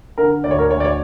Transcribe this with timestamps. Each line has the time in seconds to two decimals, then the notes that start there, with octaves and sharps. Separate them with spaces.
0.18 D3 A#4
0.44 D2 D5
0.51 C#5
0.58 A#4
0.71 D2 C#5
0.80 D5
0.85 C#5